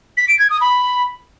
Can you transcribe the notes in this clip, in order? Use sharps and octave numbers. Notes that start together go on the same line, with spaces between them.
B6
D7
G#6
D#6
B5